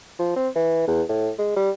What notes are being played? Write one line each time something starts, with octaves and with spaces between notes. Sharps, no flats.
F3
C4
E3
E2
A2
G#3
G3